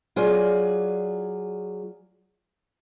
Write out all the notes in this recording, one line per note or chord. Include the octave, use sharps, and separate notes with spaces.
F#3 F4 G#4 D5